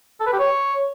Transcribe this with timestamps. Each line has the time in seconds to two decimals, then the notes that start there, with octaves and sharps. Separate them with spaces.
0.20 A4
0.27 B4
0.33 G4
0.39 C#5